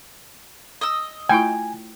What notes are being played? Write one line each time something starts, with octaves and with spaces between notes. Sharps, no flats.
D#5 E6
A3 E4 F4 G5 G#5